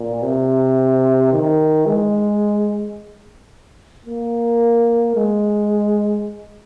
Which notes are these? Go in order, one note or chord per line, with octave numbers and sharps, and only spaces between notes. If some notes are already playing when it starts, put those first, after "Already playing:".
Already playing: A#2
C3
D#3
G#3
A#3
G#3